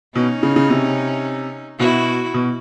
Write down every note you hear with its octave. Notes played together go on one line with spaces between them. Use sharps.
B2 C#4 D#4
C#3
C#3
C3
B2 E4 F#4
B2